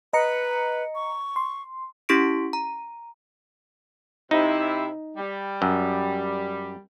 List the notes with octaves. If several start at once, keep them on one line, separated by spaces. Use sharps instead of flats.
B4 D#5 A#5 C#7
C#6
C6
C#4 E4 G4 C#6 B6 D7
A#5
C3 D#4 E4
G3
F#2